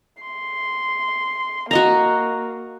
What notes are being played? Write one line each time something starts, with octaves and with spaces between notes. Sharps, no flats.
C6
A#3 F#4 D#5 A#5